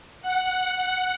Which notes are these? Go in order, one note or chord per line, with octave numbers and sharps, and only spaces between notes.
F#5